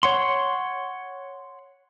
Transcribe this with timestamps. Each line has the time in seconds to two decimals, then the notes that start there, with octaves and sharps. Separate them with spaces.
0.03 C#5 F#5 C6